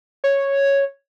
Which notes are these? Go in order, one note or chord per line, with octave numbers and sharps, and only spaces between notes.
C#5